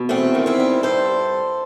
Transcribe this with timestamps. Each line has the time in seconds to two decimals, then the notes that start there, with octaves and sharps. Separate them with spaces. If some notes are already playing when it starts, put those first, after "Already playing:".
Already playing: B2
0.09 E2 A3 C4
0.35 D#3
0.46 C4 E4
0.59 G3
0.83 G2 A4 C5